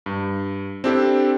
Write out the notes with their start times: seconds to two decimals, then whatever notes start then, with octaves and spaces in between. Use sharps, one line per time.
0.06 G2
0.84 C4 D4 E4 G4 A4